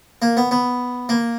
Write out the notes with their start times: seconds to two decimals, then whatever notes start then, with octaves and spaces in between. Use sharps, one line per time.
0.22 A#3
0.37 B3
0.51 B3
1.09 A#3